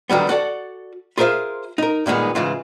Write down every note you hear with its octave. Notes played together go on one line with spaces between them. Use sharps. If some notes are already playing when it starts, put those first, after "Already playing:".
D3 D#3 F#3 G3 B3
F#4 A4 D5 F#5
F4 G#4 A#4 C5 E5 F5
D#4 A#4
G2 A#2 D#3 G#3 B3
G#2 C#3 E3 F4